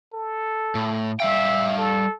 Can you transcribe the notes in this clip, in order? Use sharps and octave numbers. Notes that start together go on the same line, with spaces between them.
A4
A2
G3 E5 F5 G5
A4